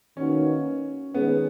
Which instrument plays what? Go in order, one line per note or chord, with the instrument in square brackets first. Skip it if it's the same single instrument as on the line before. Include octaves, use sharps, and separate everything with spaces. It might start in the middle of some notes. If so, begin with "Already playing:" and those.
[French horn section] D#3 A#3 D#4 F#4 B4 [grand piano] C#4
[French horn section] D#3 G#3 C#4 G#4 [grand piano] B3